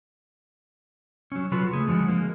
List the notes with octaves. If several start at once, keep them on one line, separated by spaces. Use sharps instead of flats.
F#3 C#4
C#3 F#3 F4 F#4 A4 B4
A3 G#4
D3 F3 G#3 F#4
G#3 A#3